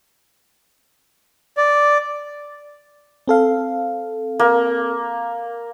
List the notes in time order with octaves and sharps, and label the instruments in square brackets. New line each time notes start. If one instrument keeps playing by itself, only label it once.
[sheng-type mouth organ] D5
[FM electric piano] C4 A4 F5
[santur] A#3